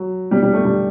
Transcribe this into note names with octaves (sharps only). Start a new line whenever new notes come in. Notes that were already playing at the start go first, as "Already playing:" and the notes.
Already playing: F#3
G3
G3
A3
G3